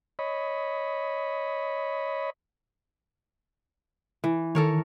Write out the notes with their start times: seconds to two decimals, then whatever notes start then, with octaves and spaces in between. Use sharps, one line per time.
0.19 C#5 D#5 B5
4.24 E3
4.55 D#3 A4 A#4 C#5